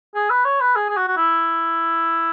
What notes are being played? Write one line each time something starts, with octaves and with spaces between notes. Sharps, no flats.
G#4
B4
C#5
B4
G#4
G#4
F#4
F#4
E4